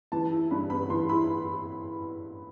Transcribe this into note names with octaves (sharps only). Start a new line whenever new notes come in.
E3 A5
E4
G2 B5
B3 B5
E3 C6
E4 B5